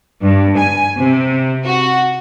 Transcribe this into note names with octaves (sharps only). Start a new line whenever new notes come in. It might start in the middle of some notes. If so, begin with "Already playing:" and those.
G2
G#5
C3
F#4